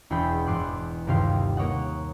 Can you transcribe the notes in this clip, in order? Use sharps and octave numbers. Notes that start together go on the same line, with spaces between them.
E1 E2 G#4 G5 B5
E2 G#2 C6 D6 F#6
G1 D#2 C3 G4 F5 C6
A#3 C#5 D#5 F#5